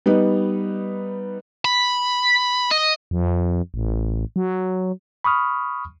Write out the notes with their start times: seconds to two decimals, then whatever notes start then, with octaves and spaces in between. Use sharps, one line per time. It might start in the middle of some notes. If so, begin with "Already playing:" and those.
0.06 G3 B3 D#4 B4
1.65 B5
2.71 D#5
3.11 F2
3.74 A1
4.36 F#3
5.24 B5 C#6 D#6 F6